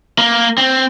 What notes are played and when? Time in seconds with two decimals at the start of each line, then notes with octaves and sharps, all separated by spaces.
0.18 A#3
0.58 C4